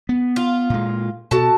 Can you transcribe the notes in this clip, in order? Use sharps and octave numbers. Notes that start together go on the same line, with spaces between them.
B3
F4
A#2 G#3
B2 F#4 A4 A5